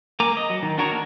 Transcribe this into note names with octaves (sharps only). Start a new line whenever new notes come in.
A#3 A#4 G#5 A#5 D6
D#5
F#3
D#3
D4 F#4 A#4 C#5
A#3 A#4